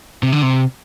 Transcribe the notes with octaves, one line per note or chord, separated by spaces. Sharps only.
C3
D3
C3